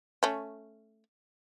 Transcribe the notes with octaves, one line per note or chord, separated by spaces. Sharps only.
A3 C#4